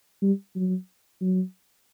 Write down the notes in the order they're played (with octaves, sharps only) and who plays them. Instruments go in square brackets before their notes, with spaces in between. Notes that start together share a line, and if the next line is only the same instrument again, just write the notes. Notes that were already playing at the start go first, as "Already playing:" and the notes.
[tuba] G3
F#3
F#3